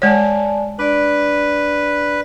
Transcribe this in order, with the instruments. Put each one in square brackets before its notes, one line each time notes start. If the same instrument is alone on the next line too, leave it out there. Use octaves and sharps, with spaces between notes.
[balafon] G#3 C#5 [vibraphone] D5 G#5 A5
[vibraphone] D4 D5 [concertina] B4